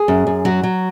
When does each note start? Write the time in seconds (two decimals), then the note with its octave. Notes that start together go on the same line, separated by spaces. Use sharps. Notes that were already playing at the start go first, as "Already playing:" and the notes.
Already playing: G#4
0.08 F#2
0.27 F#2
0.45 F#3 F#4
0.63 F#3